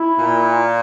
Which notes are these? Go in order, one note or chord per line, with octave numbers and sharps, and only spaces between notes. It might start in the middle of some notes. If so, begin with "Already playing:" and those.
Already playing: E4
A#2